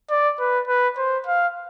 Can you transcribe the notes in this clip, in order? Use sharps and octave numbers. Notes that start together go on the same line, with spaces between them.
D5
B4
B4
C5
F5